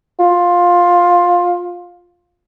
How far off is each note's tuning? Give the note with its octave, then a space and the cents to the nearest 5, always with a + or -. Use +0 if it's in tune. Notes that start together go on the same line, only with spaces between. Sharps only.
F4 +15